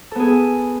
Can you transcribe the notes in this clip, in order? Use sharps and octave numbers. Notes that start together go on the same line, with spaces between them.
B3 G#4 A4